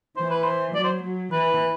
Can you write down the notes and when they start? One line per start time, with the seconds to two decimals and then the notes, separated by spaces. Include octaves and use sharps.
0.17 E3 C5
0.30 B4
0.44 C5
0.75 F#3 D5
0.84 C5
1.03 F#3
1.32 E3 B4